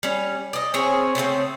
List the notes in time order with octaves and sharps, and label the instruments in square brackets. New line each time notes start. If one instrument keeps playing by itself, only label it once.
[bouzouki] G3 C#4
D5 D#5
C4 C#4 G#4 C#5
C#3 A3 A#3 C4